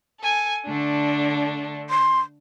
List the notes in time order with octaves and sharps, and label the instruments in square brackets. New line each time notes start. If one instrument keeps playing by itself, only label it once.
[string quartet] A4 G#5
D3 A3 D4
[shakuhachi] C6